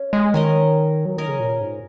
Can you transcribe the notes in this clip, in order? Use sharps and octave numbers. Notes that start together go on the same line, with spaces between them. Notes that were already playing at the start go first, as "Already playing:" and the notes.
Already playing: C#4
G#3
D#3 C#4 A#4 D#5
F#3
D#3 C#4 A#4 D#5
C#3
A#2
G#2